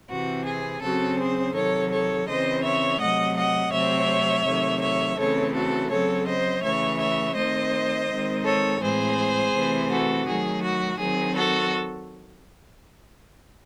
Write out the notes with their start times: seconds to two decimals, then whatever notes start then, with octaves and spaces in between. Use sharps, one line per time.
0.10 C3 E3 C4 F#4
0.46 G#4
0.82 C#3 F#3 C4 F#4 A4
1.19 G#4 C5
1.55 C3 D#3 F#3 A4 C#5
1.91 A4 C#5
2.28 C#3 E3 C4 C5 D#5
2.64 C#5 E5
3.00 C3 F#3 A3 D#5 F#5
3.37 D#5 F#5
3.72 C3 F#3 A3 C4 C#5 E5
4.45 C3 D#3 F#3 A3
4.81 C#5 E5
5.18 C#3 E3 A3 C4 A4 C#5
5.54 F#4 A4
5.90 C#3 F#3 C4 A4 C#5
6.27 C5 D#5
6.63 C#3 E3 A3 C#5 E5
6.99 C#5 E5
7.35 D#3 A3 C4 C5 D#5
8.09 D#3 G#3 C4
8.44 A4 C#5
8.81 A2 E3 G#3 C4 G#4 C5
9.53 C3 E3 A3 C4
9.90 F#4 A4
10.26 D#3 F#3 A3 G#4
10.62 F#4
10.99 D#3 F#3 C4 G#4
11.34 F#4 A4